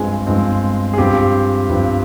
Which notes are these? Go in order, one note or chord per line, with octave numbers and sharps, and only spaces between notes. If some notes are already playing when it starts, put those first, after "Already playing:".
Already playing: G2 F3 G#3 C4 G#4
G2 F3 G#3 C4
G#4
G2 F3 C4 G4
G2 F3 C4